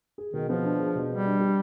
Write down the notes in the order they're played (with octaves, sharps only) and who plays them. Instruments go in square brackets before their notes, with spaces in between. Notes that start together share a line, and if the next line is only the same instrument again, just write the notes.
[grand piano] G#4
[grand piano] B2 [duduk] D#3
[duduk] F3 [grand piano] B3
[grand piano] D4
G#4
B2
[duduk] G3 [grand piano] B3
[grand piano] D4
G4